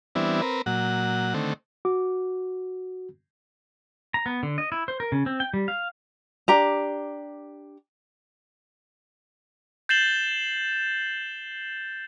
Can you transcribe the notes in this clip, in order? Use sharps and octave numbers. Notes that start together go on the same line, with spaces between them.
E3 G3 B3 C4 D4 E4
C4 A#4 B4
A#2 F#3 F#5
D3 D#3 A3 C4
F#4 D6
A#5
B3
D3
D#5
E4
C5
A#4
C#3
C4
G5
G3
F5
D4 G4 A#5
G6 A6 C7 E7 F#7 G7